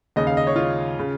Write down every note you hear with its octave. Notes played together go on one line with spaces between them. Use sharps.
D#2 C#3 D#5
F5
D#5
C#5
F4
C#3